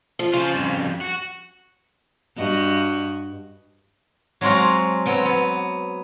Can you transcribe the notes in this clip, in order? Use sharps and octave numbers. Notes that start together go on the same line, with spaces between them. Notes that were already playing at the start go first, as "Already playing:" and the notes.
F3
C#3 F4 C5
F2 G3
F#4
G2 F#4 D#5
F#3 G#3 C4 F4 F#4
F#3 B3 C4
B3